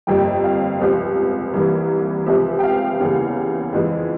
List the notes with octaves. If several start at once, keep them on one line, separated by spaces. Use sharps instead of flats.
G1 F2 C3 G3 A#3 G5
F5
C#2 C3 F3
C2 C3 E3 A#3
C#2 C3 F3 E5
G5
F5
E2 C#3 G3 A#3
F2 E3 G#3